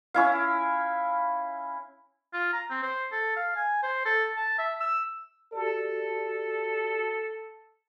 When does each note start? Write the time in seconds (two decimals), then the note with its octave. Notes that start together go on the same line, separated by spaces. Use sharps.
0.14 C#4 E4 F5
2.33 F4
2.53 A#5
2.70 C4
2.83 C5
3.12 A4
3.36 F5
3.56 G#5
3.83 C5
4.06 A4
4.36 A5
4.58 E5
4.80 E6
5.52 F#4 G4 A4 D5